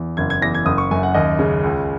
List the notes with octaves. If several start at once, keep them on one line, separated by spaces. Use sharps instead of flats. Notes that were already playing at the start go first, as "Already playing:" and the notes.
Already playing: E2
F#1 G#6
G#6
E2 A#6
G#6
F#1 D#6
C#6
F#2 G#5
F#5
D#2 D#5
C#3
C#2